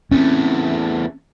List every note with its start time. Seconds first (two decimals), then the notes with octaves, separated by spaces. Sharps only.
0.11 E2 A3 C4 C#4